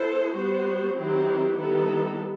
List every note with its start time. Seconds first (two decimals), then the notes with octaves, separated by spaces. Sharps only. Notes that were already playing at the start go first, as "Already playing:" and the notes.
Already playing: B3 E4 A4 C5
0.35 G3 B3 F#4 C5
0.96 D#3 F#3 C4 E4 G4
1.58 D#3 G3 B3 E4 A4